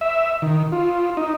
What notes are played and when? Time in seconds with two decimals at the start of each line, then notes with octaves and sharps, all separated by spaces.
0.01 E5
0.42 D#3
0.72 F4
1.17 D#4